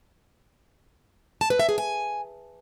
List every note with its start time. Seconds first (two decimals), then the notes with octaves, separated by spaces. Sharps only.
1.41 A5
1.50 B4
1.59 E5
1.69 G#4
1.78 G#5